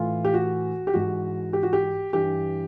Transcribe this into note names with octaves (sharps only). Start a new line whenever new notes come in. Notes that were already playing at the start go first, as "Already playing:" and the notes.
Already playing: A2 E3 F4
G4
F#4
G4
G#2 E3 F#4
G4
F#4
G4
G2 E3 G4